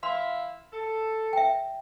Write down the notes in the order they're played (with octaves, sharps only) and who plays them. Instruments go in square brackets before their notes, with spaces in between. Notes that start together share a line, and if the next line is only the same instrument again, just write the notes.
[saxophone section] E4 E5 F5 [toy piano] C6
[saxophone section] A4
[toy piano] E5 G5